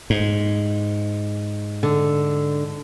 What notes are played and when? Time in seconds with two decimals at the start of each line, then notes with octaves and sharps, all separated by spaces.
0.10 G#2
1.83 D3